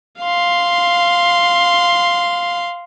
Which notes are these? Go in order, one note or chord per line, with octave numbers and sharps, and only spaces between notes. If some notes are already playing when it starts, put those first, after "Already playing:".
F5 C6